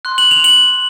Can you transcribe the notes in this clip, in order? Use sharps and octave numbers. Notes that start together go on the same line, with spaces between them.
C6 F#6
F#7
F7
F#7